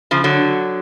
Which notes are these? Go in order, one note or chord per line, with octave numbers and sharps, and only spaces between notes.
C#3 F3
D3 F#3